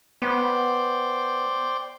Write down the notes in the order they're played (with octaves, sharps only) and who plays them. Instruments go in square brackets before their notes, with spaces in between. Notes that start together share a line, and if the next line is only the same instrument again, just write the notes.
[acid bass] B3 [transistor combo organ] C5 D5 G5